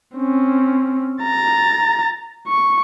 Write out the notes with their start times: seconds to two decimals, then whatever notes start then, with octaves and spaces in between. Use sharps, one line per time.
0.17 C4 C#4
1.23 A#5 A6
2.48 C#6